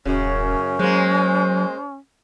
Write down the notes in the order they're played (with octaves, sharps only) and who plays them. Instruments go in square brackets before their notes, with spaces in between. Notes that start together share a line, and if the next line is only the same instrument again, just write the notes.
[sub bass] D#1 [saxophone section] F#2 [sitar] C#3 [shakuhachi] C#4
[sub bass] F#3 [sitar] G#3 A#3 [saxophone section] C5